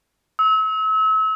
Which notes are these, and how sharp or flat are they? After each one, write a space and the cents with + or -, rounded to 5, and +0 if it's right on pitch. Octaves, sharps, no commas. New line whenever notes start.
E6 -35